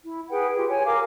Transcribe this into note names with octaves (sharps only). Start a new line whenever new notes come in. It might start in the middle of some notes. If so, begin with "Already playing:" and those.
E4
G#4 B4 F#5 G5
F4 G4 G5
C#5 G5 G#5
A#4 F5 D6